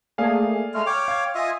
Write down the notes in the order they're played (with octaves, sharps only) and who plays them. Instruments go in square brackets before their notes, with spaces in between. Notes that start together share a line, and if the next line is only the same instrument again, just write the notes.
[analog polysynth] A3 A#3 G#4 [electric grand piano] D5 F5 G#5
[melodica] G#3 A3 [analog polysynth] F6
[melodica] C#5 G5 D6
[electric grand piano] F5 G#6
[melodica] F4 D#5 E5 [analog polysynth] G#5 D#6